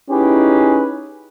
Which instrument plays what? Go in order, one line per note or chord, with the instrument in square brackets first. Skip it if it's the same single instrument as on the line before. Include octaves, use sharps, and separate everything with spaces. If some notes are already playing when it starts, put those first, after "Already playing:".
[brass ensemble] C#4 D#4 E4 G4 G#4 B4